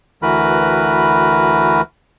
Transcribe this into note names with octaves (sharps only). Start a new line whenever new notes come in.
D2 E3 F#4 A#4 B4 B5